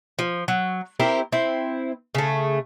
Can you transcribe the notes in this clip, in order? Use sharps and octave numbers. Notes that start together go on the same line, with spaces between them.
F3
F#3
C4 E4 G4 A#4
C4 E4
C#3 A3